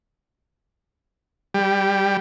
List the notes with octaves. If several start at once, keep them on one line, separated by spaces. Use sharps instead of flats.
G3